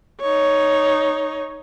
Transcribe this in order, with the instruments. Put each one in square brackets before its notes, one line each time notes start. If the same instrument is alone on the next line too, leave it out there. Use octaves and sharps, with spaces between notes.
[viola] D#4 C#5